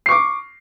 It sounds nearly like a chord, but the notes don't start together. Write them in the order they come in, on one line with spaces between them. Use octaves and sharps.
C7 C#6 D6